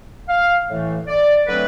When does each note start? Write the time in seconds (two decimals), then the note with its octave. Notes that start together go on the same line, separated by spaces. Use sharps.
0.29 F5
0.68 A2 E3 A3
1.08 D5
1.47 D3 F#3 A3 C4 B4